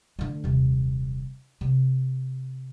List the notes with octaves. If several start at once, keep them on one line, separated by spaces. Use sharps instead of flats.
D3 A3
D#1 C3
C3